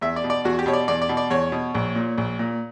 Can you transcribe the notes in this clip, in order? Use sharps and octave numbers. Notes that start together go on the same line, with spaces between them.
E2 E5
D5
B2
D5
E2 F#4
G4
B2 C#5
D5
E2 D5
D5
B2
D5
E2 C#5
B2
A#1
A#2
A#1
A#2